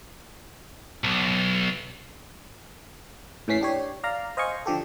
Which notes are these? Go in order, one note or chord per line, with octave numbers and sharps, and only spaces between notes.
B1
A2 E3 C#4 B6 C7
D4 G4 C#5
D5 F5 A#5
C5 D#5 F5 G#5 C#6
D3 F3 G4 A4